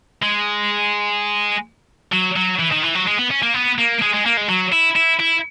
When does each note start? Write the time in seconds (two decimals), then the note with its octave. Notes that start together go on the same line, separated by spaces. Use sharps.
0.23 G#3
2.13 F#3
2.36 F#3
2.59 E3
2.71 D#3
2.83 E3
2.95 F#3
3.07 G#3
3.19 B3
3.31 C#4
3.43 A#3
3.54 B3
3.78 A#3
4.02 G#3
4.14 G#3
4.25 A#3
4.37 G#3
4.49 F#3
4.73 E4
4.96 E4
5.20 E4